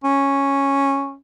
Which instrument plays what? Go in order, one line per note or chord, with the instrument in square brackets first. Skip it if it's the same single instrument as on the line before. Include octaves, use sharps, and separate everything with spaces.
[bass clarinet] C#4